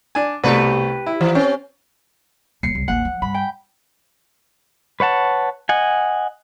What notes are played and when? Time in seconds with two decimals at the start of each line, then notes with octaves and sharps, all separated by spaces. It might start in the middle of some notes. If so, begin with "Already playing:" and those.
0.15 D4 G#5
0.44 C2 B2 A3 G4 B4
1.06 E4
1.21 E3
1.35 C4 C#4
2.63 D#1 D#4 C7 C#7
2.75 C2
2.88 A1 D#2 F#5
3.05 F3
3.22 G2 B5
3.34 G5
5.00 B4 C#5 F#5 A5
5.69 D#5 F#5 G#5